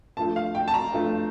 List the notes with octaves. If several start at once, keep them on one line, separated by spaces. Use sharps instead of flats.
G2 F3 A3 A5
F5
G5
A5
A#5
G2 F3 A3